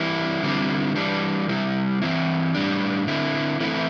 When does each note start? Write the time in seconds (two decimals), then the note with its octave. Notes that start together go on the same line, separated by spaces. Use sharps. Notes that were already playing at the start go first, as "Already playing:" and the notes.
Already playing: E3 G3 C4 E4
0.43 D3 G3 C4 E4
0.96 E3 G3 D4
1.49 C3 G3 E4
2.02 E3 C4 E4
2.55 A2 G3 D4
3.07 D3 C4 E4
3.60 E3 A3 C4 E4